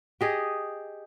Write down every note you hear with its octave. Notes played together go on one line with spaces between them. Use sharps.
G4 G#4 D#5